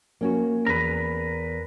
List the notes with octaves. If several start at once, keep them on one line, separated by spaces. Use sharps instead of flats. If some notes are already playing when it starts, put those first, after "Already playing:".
A#3 C#4 F#4
E2 A#4 B4